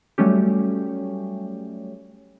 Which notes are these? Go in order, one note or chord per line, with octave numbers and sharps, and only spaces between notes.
F#3 G3 A3 C#4 G4